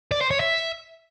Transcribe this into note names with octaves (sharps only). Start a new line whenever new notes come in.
D5
C5
C#5
E5